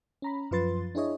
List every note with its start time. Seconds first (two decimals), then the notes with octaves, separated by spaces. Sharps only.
0.22 C#4 A#5 B5
0.51 F#2 F3 F4 B4 C6 A6
0.95 D4 E4 G#4 C#5 D#5